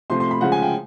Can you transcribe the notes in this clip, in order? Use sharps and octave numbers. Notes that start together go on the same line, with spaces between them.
C3 F3 A3 C6
C6
B5
C#3 F3 G#3 F#5
G#5
G5